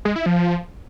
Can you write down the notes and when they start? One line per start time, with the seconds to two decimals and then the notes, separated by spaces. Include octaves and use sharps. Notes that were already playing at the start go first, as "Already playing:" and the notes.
0.05 G#3
0.16 E4
0.26 F3